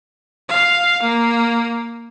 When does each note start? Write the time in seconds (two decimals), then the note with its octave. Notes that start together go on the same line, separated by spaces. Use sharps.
0.48 F5
1.02 A#3